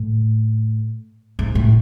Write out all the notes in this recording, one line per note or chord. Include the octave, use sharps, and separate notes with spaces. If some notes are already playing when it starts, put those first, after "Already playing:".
Already playing: A2
G#2
A2